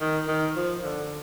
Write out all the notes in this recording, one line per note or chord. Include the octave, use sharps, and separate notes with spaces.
D#3
D#3
F3
D3